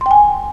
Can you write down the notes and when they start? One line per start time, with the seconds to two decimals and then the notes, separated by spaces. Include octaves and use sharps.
0.01 C6
0.06 G5
0.11 G#5